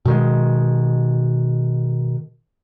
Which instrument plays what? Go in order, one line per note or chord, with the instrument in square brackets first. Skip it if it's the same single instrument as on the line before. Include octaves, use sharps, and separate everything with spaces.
[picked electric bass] B2 D#3 G#3